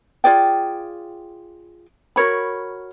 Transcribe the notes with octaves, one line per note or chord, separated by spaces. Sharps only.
F4 G#4 D5 G5
F#4 A#4 C#5 B5